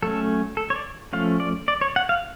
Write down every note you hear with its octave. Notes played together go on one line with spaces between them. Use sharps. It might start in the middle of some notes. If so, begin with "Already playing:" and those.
F#3 A3 C#4 A4
A4
C#5
D5
F3 A3 C#4 F5
D5
D5
C#5
F#5
F5